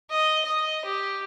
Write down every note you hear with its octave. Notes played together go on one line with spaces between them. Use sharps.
D#5
D#5
G4